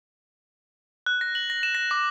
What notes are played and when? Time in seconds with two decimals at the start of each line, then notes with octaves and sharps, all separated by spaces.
1.06 F#6
1.21 A#6
1.35 F#7
1.50 A#6
1.63 E7
1.75 A#6
1.91 D6